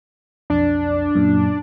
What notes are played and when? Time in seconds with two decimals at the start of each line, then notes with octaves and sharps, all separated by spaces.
0.50 B1 F2 D4
1.15 F#2 A#2